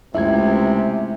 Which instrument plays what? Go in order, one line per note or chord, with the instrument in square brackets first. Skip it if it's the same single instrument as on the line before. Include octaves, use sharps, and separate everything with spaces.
[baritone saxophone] C#2 [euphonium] C3 [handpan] G#3 A3 E4 [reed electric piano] E5 G#6